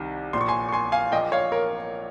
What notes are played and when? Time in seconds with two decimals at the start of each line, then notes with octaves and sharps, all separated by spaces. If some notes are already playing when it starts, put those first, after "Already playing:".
Already playing: C2 C3 D#3
0.33 A#1 A#2 C6
0.41 C#6
0.48 G#5 C6
0.69 C#6
0.72 G#5 C6
0.92 F5 G#5
1.12 A#2 D#5 G5
1.15 A#1
1.32 C#5 F5
1.52 A#4 C#5